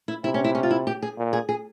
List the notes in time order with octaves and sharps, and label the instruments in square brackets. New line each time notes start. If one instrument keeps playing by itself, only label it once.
[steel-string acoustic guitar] E4
[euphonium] C3 [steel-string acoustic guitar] E4
[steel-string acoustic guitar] C#4
E4
C#4
F4
E4
G4
G#4
[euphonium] A#2
[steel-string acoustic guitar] G#4
G#4